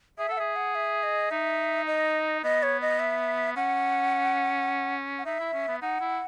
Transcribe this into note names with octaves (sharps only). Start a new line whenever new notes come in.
G#4 E5
A4 F#5
G#4 E5
F#5
E5
D#5
D#4 E5
D#5
B3 D#5
C#5
D#5
E5
C#4 F#5
F#5
D#4 E5
E4
C#4
B3
D#4 F#5
E4